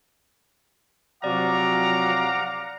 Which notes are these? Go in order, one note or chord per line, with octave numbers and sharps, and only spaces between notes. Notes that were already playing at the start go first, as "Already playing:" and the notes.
C3 F3 F#3 D5 F5 F#5 A#5 D6